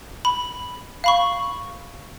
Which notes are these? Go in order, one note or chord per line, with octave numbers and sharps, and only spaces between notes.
B5
F5 B5 C#6